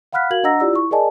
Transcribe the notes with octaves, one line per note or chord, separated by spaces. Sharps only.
F5 F#5 B5 F6 F#6 B6
F#4 A#4 F5 G#6 F#7
D4 D#5 F#5 A#5 E6 A#6
E4 F4 G4 D5 E6
E4 C#6
G#4 A#4 D5 D#5 G#5 A5